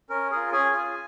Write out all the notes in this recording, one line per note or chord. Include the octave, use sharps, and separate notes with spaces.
C#4 A#4
F4 G#4 A#4
C#4 G#4 G#5
F4 G#4